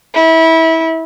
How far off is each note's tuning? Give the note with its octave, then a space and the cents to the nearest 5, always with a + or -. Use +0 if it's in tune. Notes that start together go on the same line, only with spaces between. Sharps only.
E4 -25